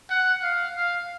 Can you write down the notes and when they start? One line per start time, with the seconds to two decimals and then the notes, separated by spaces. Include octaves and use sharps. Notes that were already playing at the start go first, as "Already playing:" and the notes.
0.10 F#5
0.43 F5
0.76 F5